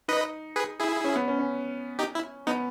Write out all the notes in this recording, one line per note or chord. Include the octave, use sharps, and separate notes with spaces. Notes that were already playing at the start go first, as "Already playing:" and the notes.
D#4 B4 D#5
G#4 B4
E4 G#4
C#4
B3
C#4
C#4
D#4 G4
E4
B3 D#4